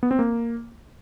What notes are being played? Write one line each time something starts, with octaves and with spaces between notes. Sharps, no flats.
B3
C4
A#3